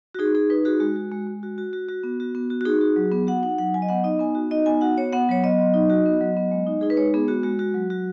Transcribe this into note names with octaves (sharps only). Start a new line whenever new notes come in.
F#4
D#4 G#4
D#4 G#4
D#4 B4
F#4 G#4
G#3 F#4
F#4
G#3
G#3
F#4
F#4
F#4
F#4
B3
F#4
B3
F#4
F#4
D#4 G#4
F#4
F#3
B3
F#4 F#5
D#4 F#5
F#3 F#5
F#3 G#5
D#5
B3 F#5
D#4 D#5
B3 G#5
F#4
D#4 D#5
B3 G#5
F#4 F#5
B3 C#5
B3 F#5
F#3 C#5
B3 D#5
F#3
D#4
F#4
B3
F#3
B3
G#3
D#4
D#4 G#4
B4
G#3 C#5
B3 G#4
G#3 F#4
G#3 F#4
F#4
F#3
F#4